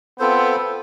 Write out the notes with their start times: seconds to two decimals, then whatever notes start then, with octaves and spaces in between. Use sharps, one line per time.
0.19 B3 C4 F4 A4 C5